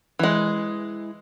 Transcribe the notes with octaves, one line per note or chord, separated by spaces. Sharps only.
E3 G#3